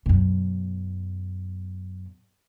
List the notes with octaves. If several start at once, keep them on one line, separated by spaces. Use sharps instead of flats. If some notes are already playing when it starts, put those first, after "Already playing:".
F#2 B2